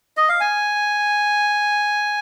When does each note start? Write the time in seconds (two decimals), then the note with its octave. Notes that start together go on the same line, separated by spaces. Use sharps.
0.17 D#5
0.29 F5
0.40 G#5